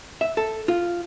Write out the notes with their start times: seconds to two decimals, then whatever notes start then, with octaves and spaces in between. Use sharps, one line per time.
0.21 E5
0.37 A4
0.68 F4